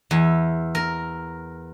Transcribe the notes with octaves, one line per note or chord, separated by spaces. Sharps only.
E2
A#4